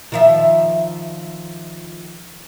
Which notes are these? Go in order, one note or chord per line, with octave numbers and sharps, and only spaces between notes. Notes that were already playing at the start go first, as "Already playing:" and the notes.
D#3 F3 E5